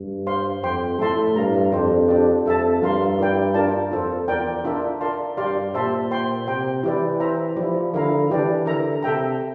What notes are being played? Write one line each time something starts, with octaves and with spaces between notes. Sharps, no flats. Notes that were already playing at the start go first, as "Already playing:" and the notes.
Already playing: G2
C5 F5 C6
F2 C5 G5 C6
A2 A4 E5 A5 C6
G2 A#4 F5 A#5
F2 D4 G4 C5
D4 G4 D5
F2 A4 E5 A5
G2 F4 A#4 F5 C6
E4 A#4 D5 G5
D4 F4 A#4 D5 A5
F2 F4 A4 C5
E2 F4 A#4 D5 G5
D4 F4 A#4 E5 A5
A#4 D5 F5 A5 C6
G2 G4 D5 F5 C6
A#2 G4 C5 E5 A5 C6
C5 G5 C6
C3 C5 G5 A#5
E3 E4 G4 D5
C5 E5 A#5
F3 E4 G4 D5
D3 E4 A#4 F5 A#5
E3 D4 G4 D5
D3 A#4 E5 A#5
C3 A4 E5 G5 A#5